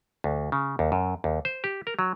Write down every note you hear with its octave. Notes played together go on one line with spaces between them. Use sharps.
D2
C#3
D#2
F#2
D#2
C5
G4
A#4
F#3